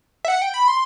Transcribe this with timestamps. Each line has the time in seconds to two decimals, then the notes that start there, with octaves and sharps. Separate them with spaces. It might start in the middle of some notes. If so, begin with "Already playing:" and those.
0.25 E5
0.28 F#5
0.42 G5
0.54 B5
0.68 C6